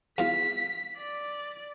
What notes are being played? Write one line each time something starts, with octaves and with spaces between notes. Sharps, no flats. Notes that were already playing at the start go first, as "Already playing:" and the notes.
E2 F4 B6
D5